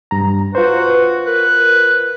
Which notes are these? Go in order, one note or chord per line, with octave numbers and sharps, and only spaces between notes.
G2 A#5
F4 F#4 B4 C5
A#4 B4